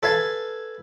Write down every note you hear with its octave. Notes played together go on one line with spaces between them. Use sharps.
A4 B4 F5 G#5 A5